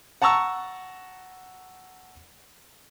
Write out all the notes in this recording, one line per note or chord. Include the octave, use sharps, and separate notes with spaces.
F#5 A5 A#5 C#6 E6